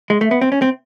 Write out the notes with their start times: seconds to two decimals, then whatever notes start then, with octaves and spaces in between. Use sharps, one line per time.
0.10 G#3
0.21 A3
0.31 B3
0.41 C4
0.52 C#4
0.62 C4